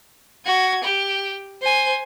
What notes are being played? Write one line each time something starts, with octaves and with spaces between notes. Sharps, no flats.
F#4 G#6
G4
C5 G#5